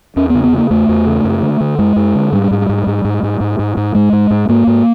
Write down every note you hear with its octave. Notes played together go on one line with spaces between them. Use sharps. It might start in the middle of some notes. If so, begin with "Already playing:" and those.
E2 C#4
C#3 B3
B3
C#3 A#3
E2 A3
E2
C#3
F#2
D3
D3
F#2 G#3
F#2
D3
G#2 G3
G#2
G#2
G#2
G#2
G#2
G#2
G#2
G#2
G#2 G#3
G#2
G#2
G#2 A#3
G#2